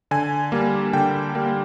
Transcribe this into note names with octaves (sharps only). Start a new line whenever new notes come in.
D3 G#5
G3 A#3
D3 G5
G3 A#3